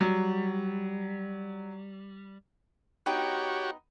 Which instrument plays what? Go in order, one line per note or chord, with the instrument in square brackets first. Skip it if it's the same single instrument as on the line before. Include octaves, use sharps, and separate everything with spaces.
[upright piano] F#3 [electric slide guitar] G3
[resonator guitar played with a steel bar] B3 D#4 G5 [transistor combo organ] F#4 G4 C#5